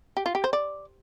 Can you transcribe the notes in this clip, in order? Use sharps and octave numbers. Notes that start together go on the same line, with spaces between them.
G4
F4
G4
C5
D5